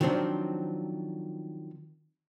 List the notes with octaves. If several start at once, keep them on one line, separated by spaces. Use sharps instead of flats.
D#3 F3 F#3 C4 D4